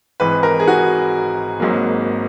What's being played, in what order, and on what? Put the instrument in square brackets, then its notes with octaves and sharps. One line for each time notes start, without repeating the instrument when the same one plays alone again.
[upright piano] G#1 G#2 E3 B4
A#4
G#4
F#4
G#1 G#2 F#3 A#3